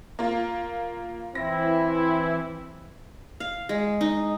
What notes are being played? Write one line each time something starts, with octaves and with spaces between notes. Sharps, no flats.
A#3 F4
E3 C4 E4 A#6
F5
G#3
D#4